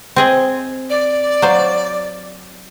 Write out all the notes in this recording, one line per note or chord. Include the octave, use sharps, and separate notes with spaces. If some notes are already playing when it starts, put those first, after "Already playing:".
C4 G#4 D#5
D5
F#3 C5 F5